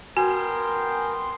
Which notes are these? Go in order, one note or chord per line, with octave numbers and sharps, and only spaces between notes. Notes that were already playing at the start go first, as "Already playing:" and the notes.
B3 F#4 A#4 G5 G#5 C6